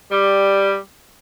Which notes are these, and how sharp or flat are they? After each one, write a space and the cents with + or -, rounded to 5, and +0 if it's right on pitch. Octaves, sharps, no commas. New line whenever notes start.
G3 +5